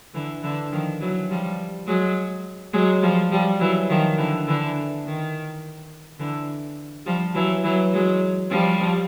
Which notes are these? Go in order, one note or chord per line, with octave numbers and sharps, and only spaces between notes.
D3 E3
D3 E3
D#3 F3
E3 F#3
F3 G3
F#3 G#3
F#3 G#3
F3 G3
F3 G3
E3 F#3
D#3 F3
D3 E3
D3 E3
D#3
D3 E3
F3 G3
E3 F#3
E3 F#3
F#3 G#3
F3 G3